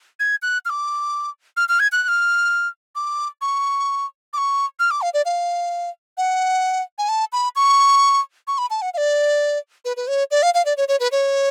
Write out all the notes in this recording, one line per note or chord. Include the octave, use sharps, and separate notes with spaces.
G#6
F#6
F6
D6
F6
F6
G#6
F#6
F#6
F6
D6
C#6
D6
C#6
F6
D6
F5
D5
F5
F#5
G#5
A5
B5
C#6
C#6
B5
A5
F#5
F5
D5
B4
B4
C#5
D5
F5
F5
D5
C#5
C#5
B4
C#5